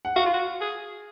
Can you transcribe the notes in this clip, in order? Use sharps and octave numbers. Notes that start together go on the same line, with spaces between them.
F#5
F#4 F5
F4
F#4
G#4